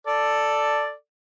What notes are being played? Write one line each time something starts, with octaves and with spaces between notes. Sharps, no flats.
A4 D5